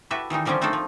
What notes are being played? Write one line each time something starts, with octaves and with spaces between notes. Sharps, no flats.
E4 F#4 G4 A4 B4 E5
D#3 E3 G3 D#4
D3 F3 G3 C4 C#4 G4
A3 A#3 C4 D4 D#4 A4
F3